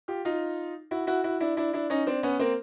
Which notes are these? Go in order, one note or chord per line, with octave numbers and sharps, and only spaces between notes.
F4 G4
D#4 F4
E4 F#4
E4 F#4
E4 F#4
D4 E4
D4 E4
D4 E4
C#4 D#4
C4 D4
B3 C#4
A#3 C4